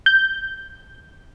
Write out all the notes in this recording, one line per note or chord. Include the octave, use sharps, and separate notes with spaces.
G6